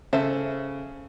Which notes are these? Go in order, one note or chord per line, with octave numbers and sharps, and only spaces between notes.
C#3 A4 C5 E5